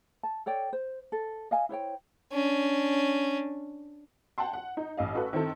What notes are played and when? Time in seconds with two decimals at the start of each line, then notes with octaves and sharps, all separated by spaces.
0.23 A5
0.46 A4 C#5 D5 G5
0.73 C5
1.12 A4
1.51 D#5 F5 G#5
1.69 E4 C5 C#5 G5
2.32 C#4 D4
4.38 F#5 G5 A5 C6
4.53 F#5
4.77 D#4
4.97 A1 D#5 F5
5.15 F#4 A4 B4
5.33 D#3 C4 E4 A4